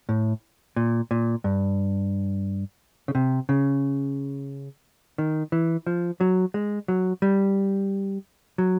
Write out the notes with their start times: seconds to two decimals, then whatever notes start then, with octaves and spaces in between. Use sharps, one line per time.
0.09 A2
0.76 A#2
1.11 A#2
1.44 G2
3.08 C#3
3.15 C3
3.49 C#3
5.18 D#3
5.52 E3
5.86 F3
6.20 F#3
6.54 G#3
6.88 F#3
7.22 G3
8.58 F#3